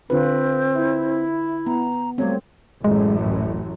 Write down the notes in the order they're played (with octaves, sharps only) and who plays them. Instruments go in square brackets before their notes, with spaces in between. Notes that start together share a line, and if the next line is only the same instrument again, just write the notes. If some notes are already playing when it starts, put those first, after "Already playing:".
[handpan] D3 F4 B4 [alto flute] C4
[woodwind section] E4
[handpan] B3 [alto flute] A#5
[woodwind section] F#3 A#3 [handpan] G3 A3 C4 [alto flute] C#5
[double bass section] A1 F#2 A2 [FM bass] G#3
[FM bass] D1